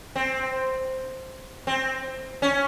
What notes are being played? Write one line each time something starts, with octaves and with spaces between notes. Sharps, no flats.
C4
C4
C#4